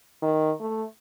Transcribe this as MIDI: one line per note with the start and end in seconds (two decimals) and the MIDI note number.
0.22 0.52 51
0.60 0.84 57